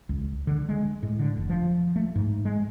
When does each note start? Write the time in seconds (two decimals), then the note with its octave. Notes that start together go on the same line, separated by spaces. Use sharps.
0.09 C#2
0.47 D3
0.69 G#3
1.03 A2
1.19 D3
1.37 F1
1.50 F3
1.96 A3
2.15 G#2
2.45 G#3